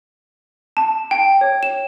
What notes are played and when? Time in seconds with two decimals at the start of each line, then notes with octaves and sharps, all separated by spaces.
0.77 A5
1.11 G5
1.41 C#5
1.63 E7